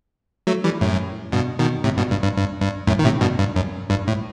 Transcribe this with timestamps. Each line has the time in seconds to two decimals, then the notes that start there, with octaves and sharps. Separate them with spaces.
0.47 F#3 A3
0.64 E3 G3
0.81 F#2 A2
1.32 G2 B2
1.59 B2 D#3
1.84 A2 C3
1.97 G2 B2
2.10 G2
2.23 G2
2.36 G2
2.61 G2
2.87 F#2 A2
2.99 D#3
3.04 A2 C3
3.21 G2 B2
3.39 G2
3.56 F#2
3.90 G2
4.07 A2